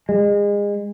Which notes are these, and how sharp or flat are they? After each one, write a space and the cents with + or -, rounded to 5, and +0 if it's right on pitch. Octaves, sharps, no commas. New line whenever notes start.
G#3 -30